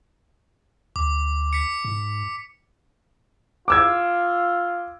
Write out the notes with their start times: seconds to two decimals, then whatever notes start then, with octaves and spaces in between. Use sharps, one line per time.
0.96 D2 D6
1.53 B6 C#7
1.85 G#2
3.68 F4 D6 E6 G#6